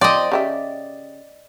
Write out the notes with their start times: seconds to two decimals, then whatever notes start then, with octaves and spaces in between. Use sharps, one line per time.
0.01 F3 C4 D5 D#5
0.32 C#3 G4 E5